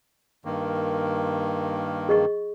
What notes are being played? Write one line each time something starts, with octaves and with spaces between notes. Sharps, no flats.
G2 D#3 A#3
G#4 D#5 C#6